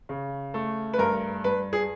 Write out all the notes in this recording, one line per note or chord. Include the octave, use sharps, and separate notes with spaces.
C#3
A3
B4
G2 A#4
G2 B4
G#4